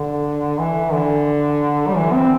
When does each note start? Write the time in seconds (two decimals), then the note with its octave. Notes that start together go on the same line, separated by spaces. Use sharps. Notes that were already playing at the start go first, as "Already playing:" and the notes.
Already playing: D3
0.58 E3
0.92 D3
1.87 G3
1.96 E3
2.13 C4